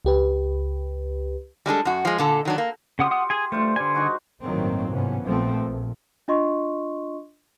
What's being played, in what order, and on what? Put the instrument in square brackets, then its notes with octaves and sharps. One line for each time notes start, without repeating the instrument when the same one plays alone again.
[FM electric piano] C#2 G4 B4
[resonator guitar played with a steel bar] G3 G#3 D4 A4
F#2 F#4
F3 G#3
A#2 D3 A4
D#3 F#3 D4
A#3
[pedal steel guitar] C#3 F#5 D#6 [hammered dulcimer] F4 G4
[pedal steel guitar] F#5 D#6
G#4 G#5
[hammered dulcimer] G2 F4 C5 [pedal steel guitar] A3
[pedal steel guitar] D3 G#5 [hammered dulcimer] G3
[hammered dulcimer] D#4 F#4 G#4
[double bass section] G1 A2 D#3 F#3 A#3 C4
G#2 C3 E3 F3 B3 C#4
A#1 A#2 F3 A3 B3 C4
A#1
[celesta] D4 F4 D#5 C6 C#6